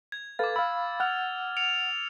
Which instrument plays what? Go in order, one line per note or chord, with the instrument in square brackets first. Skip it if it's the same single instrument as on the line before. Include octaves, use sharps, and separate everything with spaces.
[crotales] G#6
[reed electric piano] A4 B4 F5 [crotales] D6 A6
[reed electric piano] F5 B5 [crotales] E6
[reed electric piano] F#5 [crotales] E6 F6 F7
[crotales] C#7 D7 F7